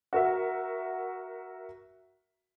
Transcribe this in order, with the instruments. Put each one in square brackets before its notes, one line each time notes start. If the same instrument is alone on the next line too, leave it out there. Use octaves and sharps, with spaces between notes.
[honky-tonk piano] F#4 A#4 E5